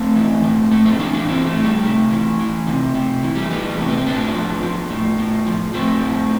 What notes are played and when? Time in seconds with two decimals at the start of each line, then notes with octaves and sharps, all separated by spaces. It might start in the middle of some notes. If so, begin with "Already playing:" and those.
Already playing: A3 C4
0.15 E3
0.43 A2
0.71 A2 A3
0.85 A3 C4
0.99 E3 B3 D4
1.13 B3 D4
1.27 E3 C4 E4
1.46 A3
1.55 A2
1.64 G3
1.82 C3 A3
2.11 E3
2.39 E3
2.67 C3
2.95 C3
3.23 E3
3.35 G3
3.42 A3
3.50 E3 G3 B3
3.69 G3
3.78 C3 A3
3.88 B3
3.98 C4
4.06 A2 B3 D4
4.35 F3
4.63 F3
4.90 A2
5.18 A2
5.46 F3
5.74 F3 A3 C4
6.02 A2